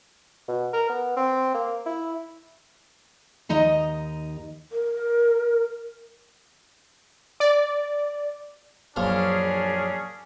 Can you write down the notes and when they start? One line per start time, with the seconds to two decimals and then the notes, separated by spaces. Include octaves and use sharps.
0.48 B2
0.73 A#4
0.90 B3
1.17 C4
1.54 A#3
1.86 E4
3.49 D#2 D#4 D#5 A#5
4.72 A#4
7.40 D5
8.96 A#1 F#2 C#4 D4 G#4 F5